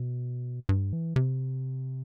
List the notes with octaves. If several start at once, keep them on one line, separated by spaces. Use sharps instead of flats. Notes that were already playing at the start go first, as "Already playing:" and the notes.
Already playing: B2
G2
E3
C3